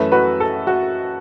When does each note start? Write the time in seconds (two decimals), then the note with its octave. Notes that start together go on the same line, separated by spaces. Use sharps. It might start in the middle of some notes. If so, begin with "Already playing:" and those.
Already playing: F#2 E3 A3 C#4 B4 E5
0.12 F#4 B4
0.40 A4
0.67 F#4